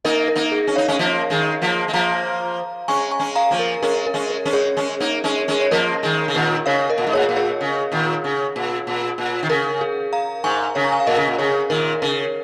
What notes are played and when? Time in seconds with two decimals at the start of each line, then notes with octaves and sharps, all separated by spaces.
0.05 A#3 D#4 A#4 D#5
0.28 A#4
0.35 A#3 D#4
0.52 G#4
0.67 C#4
0.76 D#4 C#5 F5
0.88 G#3 C#4
0.99 F3 A#3
1.30 D#3 G#3
1.62 F3 A#3
1.88 G#3
1.93 F3 A#3 F5 A#5
2.88 G#3 C#4 G#5 C#6
3.11 G#5 C#6
3.19 G#3 C#4
3.35 F5 A#5
3.51 F3 A#3
3.59 A#4
3.82 G#3 C#4 A#4
4.07 A#4
4.14 G#3 C#4
4.30 A#4
4.45 G#3 C#4
4.53 G#4 C#5
4.77 G#3 C#4
5.00 A#3 D#4
5.24 G#3 C#4
5.48 G#3 C#4
5.61 C#5
5.71 F3 A#3 A#4 D#5
6.03 D#3 G#3
6.28 C#3
6.34 A#2 D#3
6.66 C#3 C#5 F5
6.90 A#4 D#5
6.98 A#2
7.07 G#2
7.13 A#2 G#4 C#5
7.29 A#2
7.37 G#4 C#5
7.61 C#3
7.92 A#2 D#3
8.24 C#3
8.56 A#2
8.87 A#2
9.18 A#2
9.43 D#3
9.49 C#3 A#4
9.81 G#4
10.13 F5 A#5
10.44 G#2 G#5 C#6
10.75 C#3 C#5 F5
10.84 A#5
10.92 G#5
11.00 F5
11.07 A#2 A#4 D#5
11.17 C#3
11.27 A#2
11.38 C#3 G#4 C#5
11.70 A#2 D#3 A#4
12.02 C#3 A#4